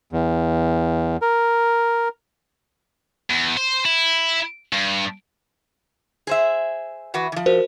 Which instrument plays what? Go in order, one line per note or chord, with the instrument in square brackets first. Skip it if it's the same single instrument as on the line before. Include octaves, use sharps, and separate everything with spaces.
[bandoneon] E2
A#4
[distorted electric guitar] E2
C5
E4
G2
[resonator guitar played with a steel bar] G#4 C5 E5
E3 F#4 B4
E3 F3
[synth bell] F#4 A#4 C5